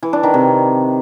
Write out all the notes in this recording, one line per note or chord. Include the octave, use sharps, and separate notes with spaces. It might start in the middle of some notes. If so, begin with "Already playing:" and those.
E3
D4
D#3
C3